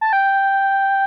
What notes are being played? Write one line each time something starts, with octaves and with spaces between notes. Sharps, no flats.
A5
G5